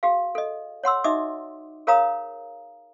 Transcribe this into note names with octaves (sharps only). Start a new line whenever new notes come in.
F#4 G#4 F5
A4 D#5
C#5 F#5 C6 E6
D#4 F#4 D#5 E5 D6 D#6
G#4 A#4 C#5 F5 A#5 D#6